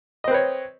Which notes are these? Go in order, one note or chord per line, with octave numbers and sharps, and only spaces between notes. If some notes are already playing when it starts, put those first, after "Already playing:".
C4 B4 C#5 D#5